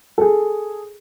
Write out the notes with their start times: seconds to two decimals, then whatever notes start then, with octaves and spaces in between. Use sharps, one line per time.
0.18 G#4 A4